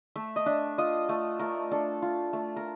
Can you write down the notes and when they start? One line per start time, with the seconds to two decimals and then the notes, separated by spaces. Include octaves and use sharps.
0.16 A3 E5
0.36 D#5
0.46 D4 E5
0.78 F4 D#5
1.09 A3
1.39 A3 A#4
1.71 D4 A4
2.02 F4
2.33 A3
2.57 A#4